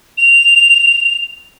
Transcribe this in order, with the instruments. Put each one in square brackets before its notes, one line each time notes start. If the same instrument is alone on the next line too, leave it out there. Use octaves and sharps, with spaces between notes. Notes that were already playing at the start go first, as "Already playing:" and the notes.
[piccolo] F7